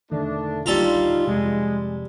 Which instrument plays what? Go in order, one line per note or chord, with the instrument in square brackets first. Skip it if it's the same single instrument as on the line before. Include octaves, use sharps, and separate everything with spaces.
[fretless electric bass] E1 D3 D#3 [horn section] A3 D4
[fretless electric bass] A#1 D#2 D3 [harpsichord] G3 A4 A#5 [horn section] D#4 F4
[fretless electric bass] F2 C3 [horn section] G#3